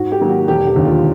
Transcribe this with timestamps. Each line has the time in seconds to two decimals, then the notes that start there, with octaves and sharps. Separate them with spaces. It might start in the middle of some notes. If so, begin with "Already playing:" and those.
Already playing: G#2 F#4
0.12 G4
0.21 D#3 F#3 A#3
0.29 F#4
0.48 E1 G4
0.67 G4
0.76 D#2 D3
0.85 F4